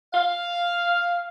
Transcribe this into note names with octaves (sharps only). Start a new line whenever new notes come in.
F5